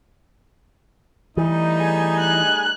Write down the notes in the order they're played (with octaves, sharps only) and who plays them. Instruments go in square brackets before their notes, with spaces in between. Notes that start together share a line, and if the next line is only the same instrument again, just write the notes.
[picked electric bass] E3 [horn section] G3 A3 D#4
[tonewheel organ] G#4 G#5
[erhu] F#6